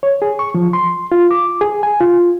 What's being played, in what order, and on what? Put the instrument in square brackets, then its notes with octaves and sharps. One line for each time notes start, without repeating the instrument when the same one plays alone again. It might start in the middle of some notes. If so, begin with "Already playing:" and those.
[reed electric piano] C#5
G#4
C#6
F3
C6
F4
D6
G#4
G#5
F4